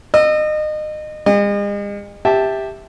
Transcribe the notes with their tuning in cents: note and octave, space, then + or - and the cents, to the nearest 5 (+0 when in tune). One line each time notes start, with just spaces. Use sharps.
D#5 -30 E6 +0
G#3 -45 D#5 -35
G4 +10 E5 -15 A5 +0